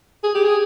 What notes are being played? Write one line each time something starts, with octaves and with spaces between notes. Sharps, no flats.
G#4
G4
G#4